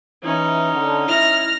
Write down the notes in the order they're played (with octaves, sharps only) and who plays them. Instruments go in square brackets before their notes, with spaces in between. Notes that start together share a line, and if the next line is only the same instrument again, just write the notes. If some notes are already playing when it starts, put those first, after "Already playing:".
[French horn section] E3 [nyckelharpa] C#4 D#4
[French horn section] D3
[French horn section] E4 [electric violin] F6 A#6